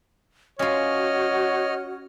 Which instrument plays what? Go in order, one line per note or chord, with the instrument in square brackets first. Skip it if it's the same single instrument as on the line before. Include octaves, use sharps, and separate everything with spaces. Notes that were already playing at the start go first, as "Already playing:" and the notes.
[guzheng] C#4 F4 [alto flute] F#4 [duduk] C#5 [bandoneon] D#5 F6